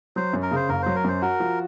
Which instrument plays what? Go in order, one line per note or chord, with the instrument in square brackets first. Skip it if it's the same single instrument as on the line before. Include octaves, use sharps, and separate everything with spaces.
[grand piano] F#3 [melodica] C5
[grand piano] F#2
[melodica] A#4
[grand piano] C#3 [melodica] C5
[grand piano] F#1 [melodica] A#4
[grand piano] F#3 [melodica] C5
[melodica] A#4
[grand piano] F#2 [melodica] C5
[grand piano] F#4 [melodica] A#4
[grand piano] F3